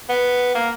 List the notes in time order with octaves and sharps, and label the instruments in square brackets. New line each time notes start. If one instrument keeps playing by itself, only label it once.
[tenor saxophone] B3
A#3